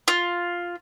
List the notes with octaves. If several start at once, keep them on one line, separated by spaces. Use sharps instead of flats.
F4